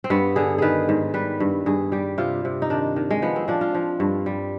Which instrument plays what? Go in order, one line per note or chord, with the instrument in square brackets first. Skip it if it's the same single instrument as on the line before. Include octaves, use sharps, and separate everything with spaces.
[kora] C4
G2 B3
D3 G#4
D#3 G#4 B4
G#2
G3 B4
G2
G2 G#4
G3 G4
C3 F4
C3
D#4
D#3 D4
D#3
G#3
F3 B3
C4
F3 D4
F4
F3
G2
G3